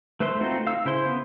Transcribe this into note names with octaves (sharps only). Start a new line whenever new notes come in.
A3 B4 C5 E5 C6
A3 C4 D#4 F4 F#4
F5 E6
C#3 E4 C5 C6
B3